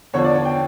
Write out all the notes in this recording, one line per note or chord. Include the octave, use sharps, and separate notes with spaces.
E2 D3 F3 C#5
D5
C#5
G5